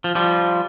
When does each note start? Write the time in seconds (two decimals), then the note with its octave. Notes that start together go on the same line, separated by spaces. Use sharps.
0.04 F3
0.15 F3 G3